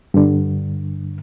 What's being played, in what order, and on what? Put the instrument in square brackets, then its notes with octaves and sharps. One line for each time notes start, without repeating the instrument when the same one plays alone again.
[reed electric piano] G2 D3